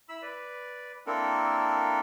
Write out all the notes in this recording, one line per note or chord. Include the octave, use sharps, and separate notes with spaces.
E4 B5 E6
B4 D5
A#3 C4 D4 E4 A4 A#4